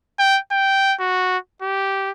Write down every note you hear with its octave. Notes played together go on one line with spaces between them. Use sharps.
G5
G5
F#4
G4